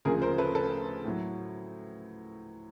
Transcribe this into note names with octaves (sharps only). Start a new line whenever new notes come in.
D2 C#3 F3 G#4 A#4
A#4 C5
A4 B4
A4 B4
A2 F#3